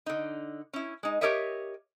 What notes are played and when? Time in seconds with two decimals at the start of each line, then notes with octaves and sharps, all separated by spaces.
0.06 D3 D#4
0.73 C#4 E4
1.03 G#3 D#4
1.21 G4 A4 A#4 C#5 D#5 E5